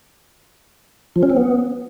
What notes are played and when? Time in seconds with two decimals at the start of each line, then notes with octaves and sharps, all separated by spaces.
1.16 F3
1.23 C#4
1.30 C4
1.37 B3